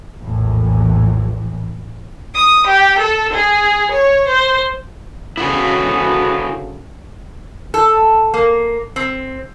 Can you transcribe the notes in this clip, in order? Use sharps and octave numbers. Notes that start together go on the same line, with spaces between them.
A#1 E2 A2 E3
D#6
G4
A4
G#4
C#5
C5
D2 C#3 B3 E4 F#4 G#4
A4
A#3
C4